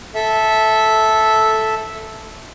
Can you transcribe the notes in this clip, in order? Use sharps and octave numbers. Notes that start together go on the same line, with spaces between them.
A4 E5